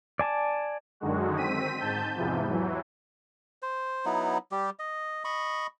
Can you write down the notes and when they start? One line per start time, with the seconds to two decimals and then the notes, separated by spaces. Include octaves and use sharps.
0.19 D5 G#5 A5
1.00 F#2 D3 D#3 G#3 F#4
1.37 C4 B6 D#7
1.78 G#2 A5 G6
2.16 E2 G#2 C3 E3 F3
2.48 E3 F#3
3.62 C5
4.05 F#3 B3 D#4 E4
4.52 G3 G4
4.79 D#5
5.25 D#5 B5 C#6